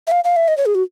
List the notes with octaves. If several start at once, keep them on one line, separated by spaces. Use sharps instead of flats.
E5
F5
F5
E5
D#5
C#5
G#4
F#4